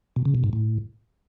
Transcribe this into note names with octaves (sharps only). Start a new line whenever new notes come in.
B2
C#3
B2
G#2
A2